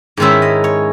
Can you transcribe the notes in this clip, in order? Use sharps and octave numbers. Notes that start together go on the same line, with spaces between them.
G#2 D#3 G#3 C#4 E4 E5
D#5
C#5